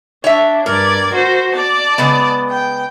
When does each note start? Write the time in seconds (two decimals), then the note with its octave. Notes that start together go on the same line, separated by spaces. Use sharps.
0.24 D4 C#5 E5
0.66 G2 A#4 D5 G#6
1.13 F#4 C5
1.52 D5 A5
1.98 C#3 G#3 B3
2.49 G5